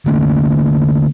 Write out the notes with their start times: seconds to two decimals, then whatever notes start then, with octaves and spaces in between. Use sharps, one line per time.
0.06 D3 A3 A#3 C#4